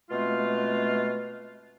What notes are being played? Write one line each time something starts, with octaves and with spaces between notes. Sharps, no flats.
B2 G#3 A3 C4 F4